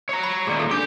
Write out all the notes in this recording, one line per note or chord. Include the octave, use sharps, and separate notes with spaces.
C#5 A#5
B5
D#2 A#2 G#4 D5
A4
D4 G4 A4 D6